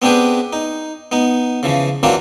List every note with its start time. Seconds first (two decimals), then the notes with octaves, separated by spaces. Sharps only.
0.02 B3 C4 D4 G4 G#4 B4
0.53 D#4
1.12 B3 D#4
1.63 C#3 E3 F3
2.03 E3 F#3 A#3 C4 D4 F4